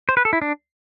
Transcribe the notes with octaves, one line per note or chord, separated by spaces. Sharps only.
C5
B4
A4
E4
D4